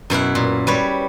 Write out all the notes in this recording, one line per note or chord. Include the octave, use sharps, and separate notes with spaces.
F#2 B2 E4 F#5
A#2
G3 B4 C#5